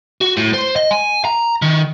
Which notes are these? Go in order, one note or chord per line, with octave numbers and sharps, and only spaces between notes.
F#4
A2
C5
D#5
G#5
A#5
D#3